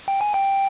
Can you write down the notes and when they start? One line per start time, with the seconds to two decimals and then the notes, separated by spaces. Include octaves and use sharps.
0.08 G5
0.21 G#5
0.34 G5